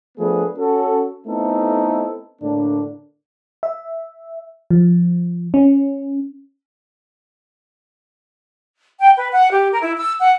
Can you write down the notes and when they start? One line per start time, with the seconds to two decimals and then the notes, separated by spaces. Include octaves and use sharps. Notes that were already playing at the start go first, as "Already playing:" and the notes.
0.18 F3 A3 B3 D4 G#4 B4
0.57 C#4 F#4 A4
1.27 A3 B3 C4 D#4 E4 A4
2.42 A2 D3 A#3 D4
3.63 E5
4.70 F3
5.54 C#4
9.00 G5
9.17 B4
9.32 F#5
9.50 G4
9.71 A#4
9.82 E4
9.96 E6
10.20 F#5